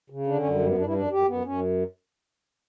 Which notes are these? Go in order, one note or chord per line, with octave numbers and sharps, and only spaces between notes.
C#3
D3 D4
C#4
F#2
G3
G2 G3
B3
G2 D4
E4
F#2 D4
F#2 G4
F#2 B3
F#2 C#4